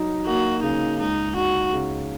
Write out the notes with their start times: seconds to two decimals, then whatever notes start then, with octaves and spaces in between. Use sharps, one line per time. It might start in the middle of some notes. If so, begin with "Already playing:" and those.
Already playing: F#3 D#4
0.26 A#3 F#4
0.63 C#3 D#4
1.00 C#2 D#4
1.35 D#4 F#4
1.73 C#3